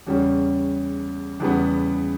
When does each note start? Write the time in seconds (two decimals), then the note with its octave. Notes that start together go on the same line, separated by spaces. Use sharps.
0.07 E2 C#3 G3 C#4
1.40 E2 C#3 E3 G3 B3